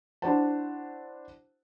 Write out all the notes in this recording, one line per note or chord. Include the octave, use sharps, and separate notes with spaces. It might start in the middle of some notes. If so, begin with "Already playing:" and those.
D4 E4 F#4 C5 F#5 A5